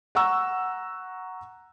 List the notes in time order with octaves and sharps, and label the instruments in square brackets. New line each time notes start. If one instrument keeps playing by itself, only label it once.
[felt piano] F#5 A#5 C#6 E6